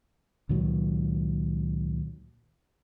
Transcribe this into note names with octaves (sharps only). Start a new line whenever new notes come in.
C#2 A#2 D#3 F#3